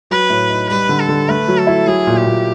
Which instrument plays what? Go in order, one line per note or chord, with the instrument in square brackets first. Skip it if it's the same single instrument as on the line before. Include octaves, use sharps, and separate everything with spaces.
[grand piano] F#3 [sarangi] B4
[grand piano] A2
D#4
[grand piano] G3 [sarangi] B4
[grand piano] D3
[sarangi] A4
[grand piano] D3
[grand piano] A3 [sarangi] B4
[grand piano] F#3
[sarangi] A4
[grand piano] E4
[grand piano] F#3 [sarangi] G#4
[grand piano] A#2
[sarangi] G4
[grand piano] A#2